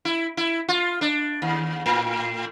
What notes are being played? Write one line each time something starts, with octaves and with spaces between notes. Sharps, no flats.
E4
E4
F4
D4
D#2
A2